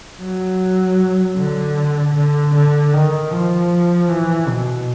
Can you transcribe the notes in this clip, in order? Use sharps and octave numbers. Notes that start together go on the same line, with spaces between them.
F#3
D3
D3
D3
D#3
F3
E3
B2